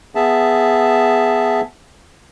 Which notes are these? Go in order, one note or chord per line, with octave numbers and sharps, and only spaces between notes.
B3 G#4 E5 A5